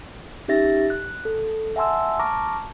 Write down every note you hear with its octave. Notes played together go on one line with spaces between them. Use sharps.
C#4 D#4 G4 E5 A6 A#6
F#6
A4
E5 F#5 G#5 A5 C6 E6
A5 A#5 C#6 D6 F6 A#6